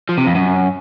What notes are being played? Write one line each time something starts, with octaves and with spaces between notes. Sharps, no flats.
F3
C3
F2
F#2